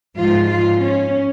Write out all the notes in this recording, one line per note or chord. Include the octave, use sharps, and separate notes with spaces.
G#2 F3 F4
F4
C#4